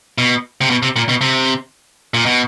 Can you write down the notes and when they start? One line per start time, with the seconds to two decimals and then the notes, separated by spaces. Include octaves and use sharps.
0.18 B2
0.61 C3
0.70 B2
0.83 C3
0.96 A#2
1.09 B2
1.21 C3
2.14 A#2
2.26 B2